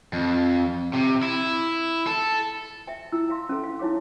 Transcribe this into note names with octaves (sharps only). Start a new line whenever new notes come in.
F2
C3
E4
A4
E5 G5
E4 E6
E5 F5 C6
C#4 A4
F5
D#4 E4 C#5 F5 D6